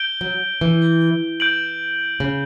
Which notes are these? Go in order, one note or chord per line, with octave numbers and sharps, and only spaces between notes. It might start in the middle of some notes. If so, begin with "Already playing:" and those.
Already playing: G6 D7 G7
F#3
E3
G6 D7 F#7
C#3